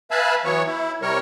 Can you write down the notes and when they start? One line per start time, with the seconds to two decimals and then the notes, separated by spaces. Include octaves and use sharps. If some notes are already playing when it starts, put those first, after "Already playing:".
0.11 B4 E5 F5 G#5 A5 B5
0.45 E3 F#3 B3 C#5 C#6
0.67 E4
1.02 C3 G3 A#4 C#5 C#6